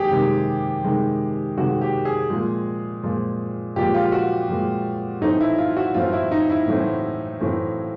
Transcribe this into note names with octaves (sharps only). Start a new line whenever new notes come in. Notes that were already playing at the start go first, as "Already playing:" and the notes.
Already playing: D#3 G#3 G4 G#4
C3 D#3 G#3
C3 D#3 G#3
C3 D#3 G#3 F#4
G4
G#4
A#2 F3 G#3
A#2 F3 G#3
A#2 F3 G#3 G4
F4
F#4
A#2 F3 G#3
A2 E3 A3 C4 D#4
E4
F4
F#4
A2 E3 A3 C4 F4
E4
D#4
E4
A2 E3 A3 C4
A2 E3 A3 C4